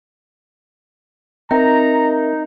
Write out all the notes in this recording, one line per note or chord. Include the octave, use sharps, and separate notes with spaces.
C4 D#4 A#4 E5 A#5